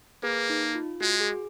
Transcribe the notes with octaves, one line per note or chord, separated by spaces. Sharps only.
A#3 G#4 B4
D#4
F4
G#3 F#4
G#4